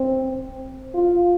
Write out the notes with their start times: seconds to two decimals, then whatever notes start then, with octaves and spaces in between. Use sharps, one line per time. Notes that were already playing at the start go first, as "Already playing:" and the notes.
Already playing: C4
0.94 F4